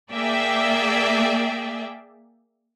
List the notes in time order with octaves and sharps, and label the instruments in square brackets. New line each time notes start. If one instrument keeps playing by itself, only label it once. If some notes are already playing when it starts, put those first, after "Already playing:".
[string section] A#3 G#4 D5 E5 G5